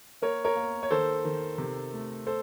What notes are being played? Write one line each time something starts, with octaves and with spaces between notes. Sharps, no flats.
A#3 A#4 C#5
A#4 C#5
A#3
C#5
D#3 A4 C5
D#3
C3
A3
A4 C5